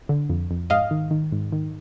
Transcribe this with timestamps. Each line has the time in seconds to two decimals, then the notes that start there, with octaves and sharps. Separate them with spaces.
0.09 D3
0.30 F2
0.51 F2
0.70 G#2 D#5 F5
0.91 D#3
1.11 D#3
1.32 G#2
1.53 D#3